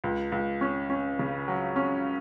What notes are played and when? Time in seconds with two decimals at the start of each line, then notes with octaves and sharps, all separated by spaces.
0.04 C#2
0.32 C#2
0.61 C#4
0.90 C#4
1.19 C#3
1.48 F#3
1.76 C#4